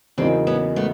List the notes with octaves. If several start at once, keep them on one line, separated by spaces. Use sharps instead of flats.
E2 C#3 F#3 A#3 C4 D4 D#4
B3 C#4
A3 B3